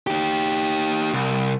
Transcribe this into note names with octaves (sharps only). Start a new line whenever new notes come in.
D#4 G4
C2